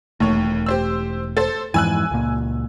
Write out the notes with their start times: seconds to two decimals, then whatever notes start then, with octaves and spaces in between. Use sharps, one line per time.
0.20 E1 D#2 A3 C#5
0.66 G4 C5 E6
1.37 A4 C5
1.74 F2 G#2 E3 G#5 E6 F#6
2.11 C#2 A#2